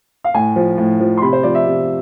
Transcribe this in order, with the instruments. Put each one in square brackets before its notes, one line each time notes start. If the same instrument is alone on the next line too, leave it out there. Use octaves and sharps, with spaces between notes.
[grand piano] F5
A2 G#5
F3
A2
F3
C6
C3 B5
C5
F3 D5
E5
C3